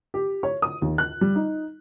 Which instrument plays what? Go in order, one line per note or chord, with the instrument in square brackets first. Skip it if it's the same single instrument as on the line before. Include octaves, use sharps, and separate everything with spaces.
[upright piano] G4
C#5
D#6
D#2
F#6
G3
D#4